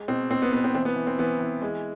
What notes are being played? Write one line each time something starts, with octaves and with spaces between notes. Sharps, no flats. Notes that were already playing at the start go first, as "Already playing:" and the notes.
Already playing: G#3
B2 C4
B2 C4
B3
B2 B3
C4
E3 C4
B3
E3
C4
E3 B3
E3
G#3